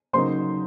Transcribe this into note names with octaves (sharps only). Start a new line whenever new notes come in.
C#3 F#3 A#3 D#4 C5 C6